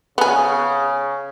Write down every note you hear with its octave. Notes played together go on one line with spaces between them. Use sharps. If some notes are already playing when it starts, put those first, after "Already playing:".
C#3 B3 G#4